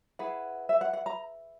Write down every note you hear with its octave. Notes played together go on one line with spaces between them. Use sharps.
E4 G#4 B4 F#5
E5
F#5
F#5
A#5